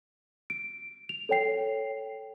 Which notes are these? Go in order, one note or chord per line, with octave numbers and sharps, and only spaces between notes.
D7
F7
A4 C#5 G5 C7